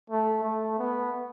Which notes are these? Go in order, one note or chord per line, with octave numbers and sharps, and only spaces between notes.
A3
A3
B3